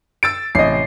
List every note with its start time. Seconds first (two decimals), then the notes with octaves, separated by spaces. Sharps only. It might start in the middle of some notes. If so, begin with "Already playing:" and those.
0.23 E6 A6 D7
0.55 A1 C3 D#5 C7